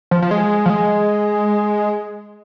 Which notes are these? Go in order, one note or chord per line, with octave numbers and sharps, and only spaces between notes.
F3
F3
G#3
F3
G#3